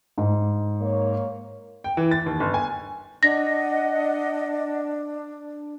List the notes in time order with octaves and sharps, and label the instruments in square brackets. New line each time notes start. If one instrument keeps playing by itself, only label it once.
[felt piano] G#2
[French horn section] A#3 C#5
[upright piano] G5
E3
A6
D#2
G1
G#5
[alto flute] D4 [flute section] D#5 F#5 [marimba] A#6